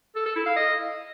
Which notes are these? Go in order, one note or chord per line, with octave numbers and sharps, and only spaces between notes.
A4
A4
E4
F5
D#5